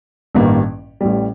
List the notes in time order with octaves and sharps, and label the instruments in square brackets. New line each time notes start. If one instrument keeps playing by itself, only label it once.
[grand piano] A1 G2 D#3 A#3
A1 A2 G3